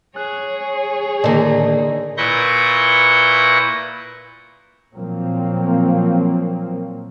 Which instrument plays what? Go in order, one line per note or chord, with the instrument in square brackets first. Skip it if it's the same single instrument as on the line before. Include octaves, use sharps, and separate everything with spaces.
[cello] G#4 C#5 [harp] F#6
[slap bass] A2 D#3 [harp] D3 [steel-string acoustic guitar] A#3 D#4
[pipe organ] A#2 E4 B4 C#6 G6 A#6
[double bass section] A#2 F3 F#3 A#3 C4